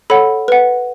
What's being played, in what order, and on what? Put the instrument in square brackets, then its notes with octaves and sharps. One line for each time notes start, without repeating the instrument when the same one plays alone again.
[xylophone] A4 C#5 F#5 B5
B4 F#5